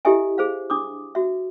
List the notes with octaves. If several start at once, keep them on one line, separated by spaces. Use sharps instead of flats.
E4 G4 A4 D#5 E5 G#5
G#4 C5 F5
D4 D6 D#6
F#4 E5